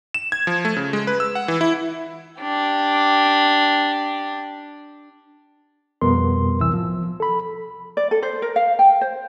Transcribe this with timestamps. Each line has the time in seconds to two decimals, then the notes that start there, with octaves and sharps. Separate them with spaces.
0.14 E7
0.32 G#6
0.47 F3
0.65 A3
0.77 C#3
0.93 G#3
1.07 B4
1.20 E6
1.35 F#5
1.48 E3
1.61 E4
2.41 D4 G4
6.01 F2 B2 G3 B3 A#4 C6
6.60 C2 A2 C3 E3 E6
6.74 F3
7.20 A4 B5
7.97 D5
8.11 A4
8.23 C5
8.42 A#4
8.56 F5
8.79 G5
9.01 C5